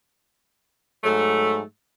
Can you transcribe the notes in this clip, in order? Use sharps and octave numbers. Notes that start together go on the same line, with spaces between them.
G#2 F#3 A3